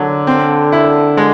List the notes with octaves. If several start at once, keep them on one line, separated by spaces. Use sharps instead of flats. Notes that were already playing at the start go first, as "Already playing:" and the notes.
Already playing: D3 F#3
C4
E4
G#3